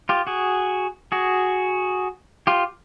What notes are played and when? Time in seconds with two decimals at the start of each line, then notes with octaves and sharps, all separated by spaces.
0.09 F4 G4
0.27 F#4 G#4
1.12 F#4 G#4
2.47 F4 G4